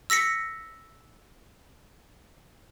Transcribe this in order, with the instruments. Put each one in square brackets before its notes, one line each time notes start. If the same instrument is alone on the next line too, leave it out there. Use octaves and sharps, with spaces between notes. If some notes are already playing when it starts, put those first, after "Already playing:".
[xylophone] E6 A#6 B6 C#7